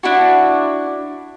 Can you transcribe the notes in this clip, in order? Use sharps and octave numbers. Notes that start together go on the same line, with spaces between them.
D4 E4 F#4